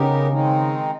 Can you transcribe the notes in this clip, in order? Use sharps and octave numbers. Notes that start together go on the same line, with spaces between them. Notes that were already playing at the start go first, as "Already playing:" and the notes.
Already playing: C#3 B3 D#4 G4 A#4
D#3 G#3 C4 D#4